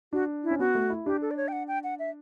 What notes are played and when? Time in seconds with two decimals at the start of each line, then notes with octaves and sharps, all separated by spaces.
0.13 D4 F#4
0.44 E4
0.51 C#4
0.59 B3 F#4
0.75 A3
0.90 E4
1.06 D4 G4
1.22 A4
1.31 D5
1.37 C#5
1.48 G5
1.52 F#5
1.68 G5
1.84 F#5
1.99 E5